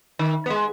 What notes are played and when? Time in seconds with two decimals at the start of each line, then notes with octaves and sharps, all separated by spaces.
0.19 D#3
0.46 B3
0.50 G#3